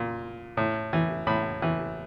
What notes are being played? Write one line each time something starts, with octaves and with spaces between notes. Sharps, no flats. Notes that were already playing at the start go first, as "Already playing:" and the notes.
Already playing: A#2
A2
E3
A2 B5
E3